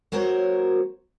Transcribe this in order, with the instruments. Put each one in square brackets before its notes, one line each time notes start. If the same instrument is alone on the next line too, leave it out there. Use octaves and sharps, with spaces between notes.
[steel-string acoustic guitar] F#3 A#3 F#4 A#4 C5 C#5